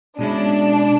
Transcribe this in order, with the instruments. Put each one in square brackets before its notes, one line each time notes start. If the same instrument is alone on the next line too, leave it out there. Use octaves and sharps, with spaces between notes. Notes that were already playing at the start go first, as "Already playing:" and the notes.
[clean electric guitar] B2 G#3 C#4 E4 [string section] D4